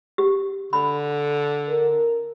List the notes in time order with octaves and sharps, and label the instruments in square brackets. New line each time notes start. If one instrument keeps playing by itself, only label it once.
[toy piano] G4
[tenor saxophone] D3 [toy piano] B5
[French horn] A#4